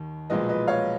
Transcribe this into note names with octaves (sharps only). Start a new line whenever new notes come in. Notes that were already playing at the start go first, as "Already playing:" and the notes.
Already playing: D#2 D#3
B1 A#2 F3 G#3 B4 D#5
B4 D#5
C#5 F5